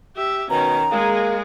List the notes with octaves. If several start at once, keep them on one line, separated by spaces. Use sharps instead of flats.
G4 E5
B2 D#3 C#4 A#5
G#3 A#3 G#4